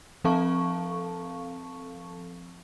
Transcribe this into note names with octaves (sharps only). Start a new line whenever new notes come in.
F3 C4 A4 F5 A5 C#6